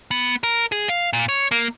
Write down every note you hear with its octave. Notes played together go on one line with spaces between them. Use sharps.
B3
A#4
G#4
F5
A#2
C#5
A#3